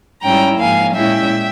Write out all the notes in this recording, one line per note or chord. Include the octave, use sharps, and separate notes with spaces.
G#2 G3 C#4 E4 G5 A#5
G#2 F3 A#3 F5 G#5
A#2 G#3 C#4 E4 E5 G5